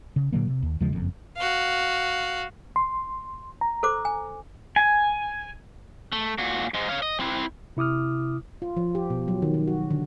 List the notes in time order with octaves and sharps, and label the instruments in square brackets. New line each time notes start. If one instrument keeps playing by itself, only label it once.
[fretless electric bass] C#3
A#2 D3 F#3 A#3
C3
D#2
D#2 C#3 F3 G#3
F#1 F2
[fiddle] F#4 F5
[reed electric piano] C6
A#5
[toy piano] A4 C5 D6
G#5
[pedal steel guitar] G#5
[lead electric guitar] A3
A#2 F#4
G#2 G#3
C#5 F5
D#5
C4 E4
[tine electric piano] C3 E4 D6 D#6 F6
[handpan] F4
F3
G4
B2
F#3
D#3
D#3
F#4
D3